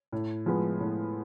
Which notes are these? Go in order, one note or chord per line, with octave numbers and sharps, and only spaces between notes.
A2
F3 G#3 B3
A2